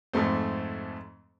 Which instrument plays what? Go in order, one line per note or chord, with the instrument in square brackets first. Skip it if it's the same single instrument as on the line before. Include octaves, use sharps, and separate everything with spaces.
[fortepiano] F2 G#2 A3 C4